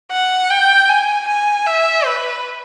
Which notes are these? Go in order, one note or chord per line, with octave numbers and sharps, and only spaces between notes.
F#5
G5
G#5
G#5
E5
B4